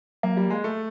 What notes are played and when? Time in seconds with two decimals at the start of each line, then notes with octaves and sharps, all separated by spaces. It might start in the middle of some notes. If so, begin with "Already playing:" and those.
0.23 F#3 A#3
0.37 G3
0.50 G#3
0.64 A3